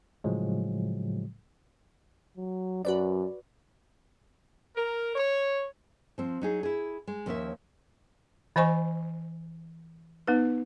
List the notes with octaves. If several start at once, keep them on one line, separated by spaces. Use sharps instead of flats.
A2 C#3 F3 F#3 G#3
F#3
F#2 F#4 B4 D5
A#4
C#5
F3 C4
F#3 D#4 G#4
E4 G#4
G#3
D#2 F3 C#4 A4 A#4 E5
E3 C5 D#5 G#5 C#6
B3 D#4 B4